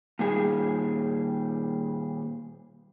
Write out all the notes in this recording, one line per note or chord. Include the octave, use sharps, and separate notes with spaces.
A#2 D#3 G3 G#4